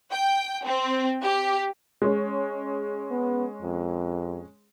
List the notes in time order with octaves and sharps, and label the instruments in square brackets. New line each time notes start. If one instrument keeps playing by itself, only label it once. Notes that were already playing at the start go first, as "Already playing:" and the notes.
[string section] G5
C4
G4
[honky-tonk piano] G#3 C#4
[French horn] B3
F2